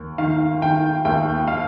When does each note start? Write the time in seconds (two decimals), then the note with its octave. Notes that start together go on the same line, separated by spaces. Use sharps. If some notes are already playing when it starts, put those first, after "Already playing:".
Already playing: D#2
0.18 D#3 F5
0.62 D#3 G5
1.05 D#2 G5
1.48 F5